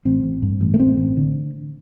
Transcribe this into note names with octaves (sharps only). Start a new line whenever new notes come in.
A1 C4
A1
G2
A1
A3
A1 C4
A1
D3